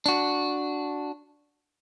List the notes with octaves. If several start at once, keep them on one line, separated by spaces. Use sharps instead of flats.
D4 F#4